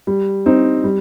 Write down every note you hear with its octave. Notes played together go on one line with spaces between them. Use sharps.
G3
C4 D#4
G3